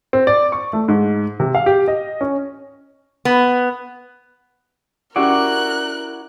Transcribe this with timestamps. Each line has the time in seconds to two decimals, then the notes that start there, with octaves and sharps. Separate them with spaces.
0.13 C4
0.27 D5
0.52 C#6
0.73 A3
0.88 G#2
1.40 C3
1.55 F5
1.66 G4
1.88 D#5
2.21 C#4
3.25 B3
5.16 C#4 E4 F#4 G4 A#4 D5 F#5 F#6